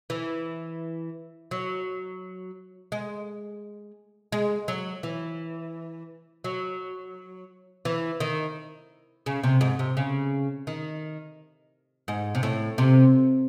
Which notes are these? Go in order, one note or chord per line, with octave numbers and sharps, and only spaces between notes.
E3
F#3
G#3
G#3
F#3
E3
F#3
E3
D#3
C#3
C3
G#2
C3
C#3
D#3
G#2
C3
A2
C3